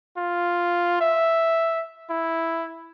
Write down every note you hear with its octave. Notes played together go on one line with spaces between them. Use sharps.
F4
E5
E4